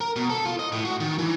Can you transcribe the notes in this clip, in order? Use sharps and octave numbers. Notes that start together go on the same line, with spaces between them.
A#4
B2
A4
F4
D#5
A2
F#4
D#3
E3